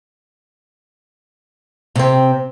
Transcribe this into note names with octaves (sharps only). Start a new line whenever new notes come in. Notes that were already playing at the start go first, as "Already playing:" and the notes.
C3 C4